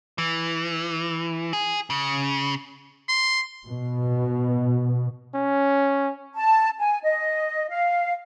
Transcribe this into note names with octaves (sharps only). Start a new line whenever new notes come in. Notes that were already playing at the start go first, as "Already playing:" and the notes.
E3
G#4
C#3
C6
B2
C#4
A5
G#5
D#5
F5